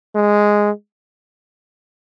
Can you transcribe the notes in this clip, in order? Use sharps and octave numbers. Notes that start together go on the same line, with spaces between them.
G#3